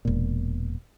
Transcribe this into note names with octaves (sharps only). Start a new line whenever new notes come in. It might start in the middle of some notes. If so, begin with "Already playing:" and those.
E1 A#2